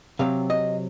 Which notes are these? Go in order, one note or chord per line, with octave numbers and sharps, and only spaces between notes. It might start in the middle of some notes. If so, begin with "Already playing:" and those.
C3 F#3 C4 F5
D#5